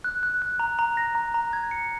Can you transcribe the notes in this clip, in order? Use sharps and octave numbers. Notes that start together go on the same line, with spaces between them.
F#6
F#6
F#6
A#5
A#5
A#6
A#5
A#5
G#6
C#7